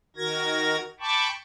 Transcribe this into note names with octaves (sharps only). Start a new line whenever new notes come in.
D#3 F#4 A#4 G#6 A#6
G5 A5 B5 C#6 D6